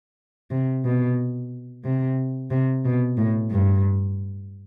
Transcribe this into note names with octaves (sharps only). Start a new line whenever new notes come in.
C3
B2
C3
C3
B2
A2
G2